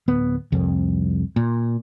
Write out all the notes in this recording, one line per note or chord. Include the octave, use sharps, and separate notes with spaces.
D1 B3
C2 F2
A#2